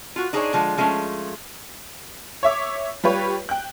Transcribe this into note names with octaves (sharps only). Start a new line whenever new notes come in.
F4 F#4
D4 D#4 G#4 C5 C#5
D3 F3 G#3
F3 G#3 A3 C#4
C#5 E5 D6
G3 F4 G4 B4 C#5
G5 F#6